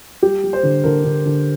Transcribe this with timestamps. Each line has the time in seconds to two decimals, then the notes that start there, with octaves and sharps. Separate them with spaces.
0.23 G3 G4
0.44 G3
0.53 C5
0.63 D3
0.84 D3 A#4
1.04 D3
1.26 D3